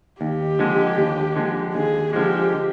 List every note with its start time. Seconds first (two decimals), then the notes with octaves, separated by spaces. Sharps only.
0.21 D#2 G4
0.59 D3 F3 G#3
0.98 D#2
1.36 D3 F3 G#3
1.74 D#2 G#4
2.13 D3 F3 G#3 G4